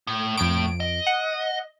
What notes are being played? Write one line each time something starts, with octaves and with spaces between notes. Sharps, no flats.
A2
F2 A2 D7
D#5
F#5